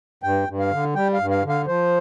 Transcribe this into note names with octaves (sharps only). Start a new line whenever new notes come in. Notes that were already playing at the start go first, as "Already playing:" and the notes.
G2 G5
G2
F5
D3
G3 G5
F5
G2
F5
D3
F5
F3 C5